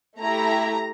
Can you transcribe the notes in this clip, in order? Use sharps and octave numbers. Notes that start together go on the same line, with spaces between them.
A3 E4 G4 A#5